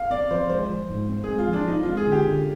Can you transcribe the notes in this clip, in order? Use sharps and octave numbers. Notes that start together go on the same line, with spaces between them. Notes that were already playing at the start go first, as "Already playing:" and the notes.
Already playing: F5
C4 D5
F3 C5
G#3 C5
F3
G#2
C4
G#4
G#3
F4
F3 D4
C4 D#4
F4
G#3
G#4
D3 G4
D3